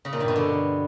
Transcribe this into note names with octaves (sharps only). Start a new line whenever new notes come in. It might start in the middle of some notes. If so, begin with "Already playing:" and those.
C#3
A#2
G2
B2
D3